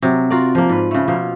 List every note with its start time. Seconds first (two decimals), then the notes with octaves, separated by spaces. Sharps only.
0.02 C3 F#3
0.30 F4 F#4 A#4 D5
0.55 F3 A#3
0.69 G#2 B4
0.91 C#3 A3
1.08 B2 F3 A#3